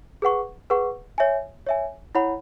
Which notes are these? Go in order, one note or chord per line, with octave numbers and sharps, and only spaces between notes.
G#4 B4 F#5 C#6
G#4 B4 F#5 C#6
C#5 E5 G#5
C#5 E5 G#5
E4 C#5 F#5 B5